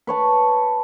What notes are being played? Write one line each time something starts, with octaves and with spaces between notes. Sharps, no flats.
B4 C#5 A5